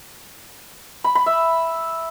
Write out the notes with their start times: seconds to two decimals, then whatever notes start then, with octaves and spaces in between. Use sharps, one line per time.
1.04 B5
1.15 B5
1.26 E5